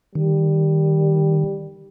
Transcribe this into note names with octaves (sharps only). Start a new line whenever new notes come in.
D#3 G3